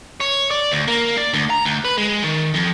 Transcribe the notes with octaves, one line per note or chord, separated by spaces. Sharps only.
C#5
D5
D2
A#3
D5
D2
A#5
D2
B4
G#3
D#3
F2